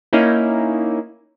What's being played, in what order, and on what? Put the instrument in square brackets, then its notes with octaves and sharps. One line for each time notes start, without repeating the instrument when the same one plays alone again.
[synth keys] A#3 C#4 D#4 E4